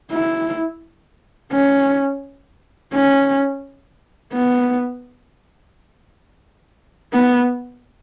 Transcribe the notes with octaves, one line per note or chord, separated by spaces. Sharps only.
E4
C#4
C#4
B3
B3